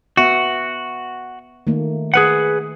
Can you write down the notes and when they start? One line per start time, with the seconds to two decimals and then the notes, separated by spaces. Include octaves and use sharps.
0.17 B3 F#4 E5
1.67 D#3 A3 A#3
2.14 G#4 B4 F#5